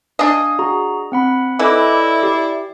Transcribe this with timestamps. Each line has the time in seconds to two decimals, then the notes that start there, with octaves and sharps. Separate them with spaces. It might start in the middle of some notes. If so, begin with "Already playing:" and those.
0.19 D4 D#5 F5 G#5
0.59 F#4 G#4 A#5
1.12 C4 F#5 B5
1.59 E3 E4 A4 D5 D#5 D6
2.23 G4